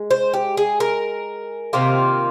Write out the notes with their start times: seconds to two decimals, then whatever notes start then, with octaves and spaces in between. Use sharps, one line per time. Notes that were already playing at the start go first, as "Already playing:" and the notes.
Already playing: G#3
0.11 C5
0.34 G4
0.57 G#4
0.80 A#4
1.73 C3 D#3 A#3 F4